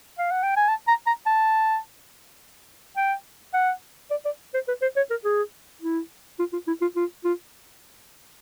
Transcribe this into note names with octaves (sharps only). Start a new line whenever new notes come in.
F5
F#5
G5
G#5
A5
A#5
A#5
A5
G5
F#5
D5
D5
C5
B4
C5
C#5
A#4
G#4
E4
F4
F4
E4
F4
F4
F4